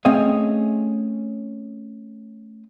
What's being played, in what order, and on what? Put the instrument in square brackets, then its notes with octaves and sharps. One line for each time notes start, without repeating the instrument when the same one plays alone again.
[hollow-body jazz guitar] A3 C4 C#4 G#4 D#5 F5